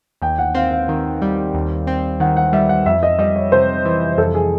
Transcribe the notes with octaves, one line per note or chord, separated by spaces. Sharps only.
D#2 G5
F#5
C4 F5
F5
D#3
G3
D#2
C4
D#3 F#5
F#5
G3 E5
F#5
F2 E5
D#5
G3 D#5
C#5
C3 C5
E3
F2 A4
G#4